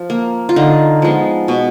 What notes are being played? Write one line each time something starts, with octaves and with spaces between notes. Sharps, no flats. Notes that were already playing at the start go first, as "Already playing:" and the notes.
Already playing: F3
A#3
F4
D3 D#4
F3 G#3 B3
B2